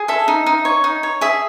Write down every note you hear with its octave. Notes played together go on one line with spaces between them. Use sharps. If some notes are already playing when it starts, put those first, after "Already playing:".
Already playing: G#4
A4 E5
D#4
D#4
C#5
D#4
C#5
G#4 E5